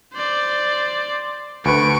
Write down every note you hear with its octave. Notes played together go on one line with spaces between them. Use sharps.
C5 D5
D2 B4 C#6 D7